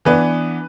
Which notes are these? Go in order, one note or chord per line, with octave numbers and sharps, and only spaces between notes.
E3 B3 D4 B4